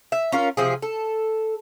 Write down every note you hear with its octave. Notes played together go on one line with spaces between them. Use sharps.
E5
C#4 F4 A#4
C3 F3 G#4
A4